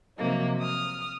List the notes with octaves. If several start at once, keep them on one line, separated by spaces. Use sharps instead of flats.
C3 F3 F#3 A#3 D#4
D#6 F6